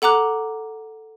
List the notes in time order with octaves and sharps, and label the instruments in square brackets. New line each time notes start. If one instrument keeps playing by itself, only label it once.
[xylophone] A4 F#5 A#5 D6 F#6